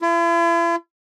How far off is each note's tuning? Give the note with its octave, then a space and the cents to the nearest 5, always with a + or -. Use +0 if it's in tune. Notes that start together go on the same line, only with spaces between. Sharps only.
E4 +45